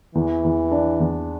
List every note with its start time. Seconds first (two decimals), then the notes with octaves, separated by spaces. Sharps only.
0.15 E2 E3
0.44 E2
0.71 D4
1.00 E2